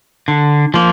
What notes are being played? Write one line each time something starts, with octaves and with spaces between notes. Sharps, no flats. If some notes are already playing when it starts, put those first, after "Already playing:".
D3
F3 A#3